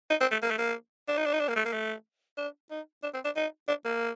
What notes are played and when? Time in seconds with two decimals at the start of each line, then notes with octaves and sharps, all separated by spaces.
0.10 D#4
0.21 C4
0.32 A3
0.43 A#3
0.51 A3
0.58 A#3
1.09 D4
1.17 D#4
1.26 D4
1.33 D#4
1.40 D4
1.49 A#3
1.56 A3
1.65 A#3
1.73 A3
2.38 D4
2.71 D#4
3.03 D4
3.14 C4
3.25 D4
3.36 D#4
3.68 D4
3.85 A#3